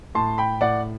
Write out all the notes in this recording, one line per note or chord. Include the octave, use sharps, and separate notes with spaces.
A2 A5 C6
G5 B5
A2 D5 F#5